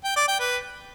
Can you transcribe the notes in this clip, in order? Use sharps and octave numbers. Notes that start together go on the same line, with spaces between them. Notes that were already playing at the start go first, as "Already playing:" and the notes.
G5
D5
G5
B4